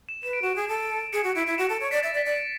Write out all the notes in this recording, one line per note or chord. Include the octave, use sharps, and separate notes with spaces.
E7
B4 E7
D7
F#4 E7
G#4
A4
G#4 C#7
F#4
E4 D7
E4
F#4 E7
A4 E7
C#5 D7
D5 B6
E5 A6
D5
B6
D5
D7